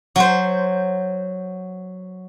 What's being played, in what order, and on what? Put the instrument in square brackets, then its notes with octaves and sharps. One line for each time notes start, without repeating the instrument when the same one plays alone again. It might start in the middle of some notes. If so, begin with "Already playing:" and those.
[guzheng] F#3 C5